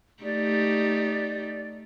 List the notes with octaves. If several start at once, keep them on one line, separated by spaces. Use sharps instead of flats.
A3 D#4 G4 D5